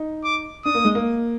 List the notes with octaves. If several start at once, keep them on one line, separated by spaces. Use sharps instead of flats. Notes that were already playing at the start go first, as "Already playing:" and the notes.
Already playing: D#4
D6
D4 D#6
A#3
G#3
A#3